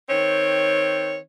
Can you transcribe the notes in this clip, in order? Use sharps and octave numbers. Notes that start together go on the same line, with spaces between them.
D#3 C4 C#5